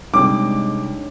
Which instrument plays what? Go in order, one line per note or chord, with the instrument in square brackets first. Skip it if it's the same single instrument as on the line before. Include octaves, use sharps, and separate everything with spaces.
[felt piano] C3 G3 [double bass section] G#3 [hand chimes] D4 D#4 C#5 [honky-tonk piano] D6